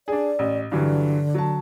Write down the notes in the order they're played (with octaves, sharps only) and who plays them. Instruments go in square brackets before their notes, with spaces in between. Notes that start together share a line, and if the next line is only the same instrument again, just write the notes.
[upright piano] D4 G#4 [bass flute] D5
[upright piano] A1
[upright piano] G2 E3 F#3 [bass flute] D3
[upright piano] F#3 A5